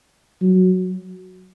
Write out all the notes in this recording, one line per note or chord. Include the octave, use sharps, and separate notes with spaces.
F#3